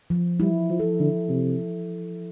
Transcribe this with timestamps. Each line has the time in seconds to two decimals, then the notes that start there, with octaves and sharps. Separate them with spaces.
0.10 F3
0.40 G3 E4
0.70 F3
0.79 A4
1.00 D3
1.29 C3